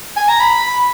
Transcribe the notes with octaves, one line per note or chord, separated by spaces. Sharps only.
G#5
A#5
B5